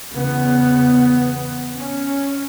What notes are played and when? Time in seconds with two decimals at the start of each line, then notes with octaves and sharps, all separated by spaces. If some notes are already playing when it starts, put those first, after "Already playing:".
0.12 E2 C#3 B3
1.75 C#4